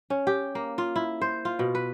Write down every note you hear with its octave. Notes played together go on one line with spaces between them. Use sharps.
C#4
G4
A#3
F4
E4
C5
F4
B2
B4